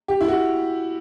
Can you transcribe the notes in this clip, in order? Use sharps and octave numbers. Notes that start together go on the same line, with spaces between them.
G4
E4
F#4